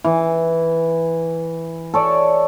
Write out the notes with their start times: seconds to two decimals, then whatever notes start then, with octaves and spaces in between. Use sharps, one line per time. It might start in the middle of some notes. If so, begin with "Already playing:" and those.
0.04 E3
1.94 A4 C#5 D5